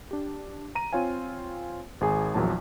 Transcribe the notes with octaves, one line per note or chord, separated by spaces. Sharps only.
D4 G4
A#5 D#7
C4 F4 C#5 F5 G#5
G#1 G#4 G#5
A#1 E2 A#2 F#3 A5